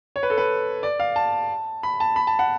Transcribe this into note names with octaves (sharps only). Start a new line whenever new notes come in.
C#5
B4
A4
B4
D5
F5
A5
B5
A5
B5
A5
F#5